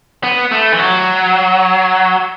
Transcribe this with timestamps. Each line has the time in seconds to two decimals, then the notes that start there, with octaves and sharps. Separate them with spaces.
0.23 B3
0.51 A3
0.72 E3
0.79 F#3